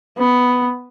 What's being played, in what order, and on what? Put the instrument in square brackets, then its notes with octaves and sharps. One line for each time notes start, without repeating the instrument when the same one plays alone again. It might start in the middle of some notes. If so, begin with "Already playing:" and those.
[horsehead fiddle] B3